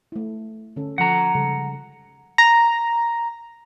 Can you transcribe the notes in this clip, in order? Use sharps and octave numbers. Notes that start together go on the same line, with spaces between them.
A3 E4
D3 C#4 A4
D3 F3 A4 F#5 A#5
C#3 G3 A4
A#5